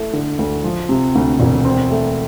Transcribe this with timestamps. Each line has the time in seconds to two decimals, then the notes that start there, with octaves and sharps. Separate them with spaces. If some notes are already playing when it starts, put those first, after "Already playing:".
Already playing: A3 E4
0.13 D3
0.39 D2
0.64 F3
0.89 C3
1.15 D2
1.40 E1
1.65 C4
1.90 A3